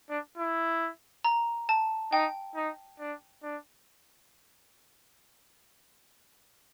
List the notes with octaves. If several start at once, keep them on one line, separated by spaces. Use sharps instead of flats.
D4
E4
A#5
A5
D#4 G5
D#4
D4
D4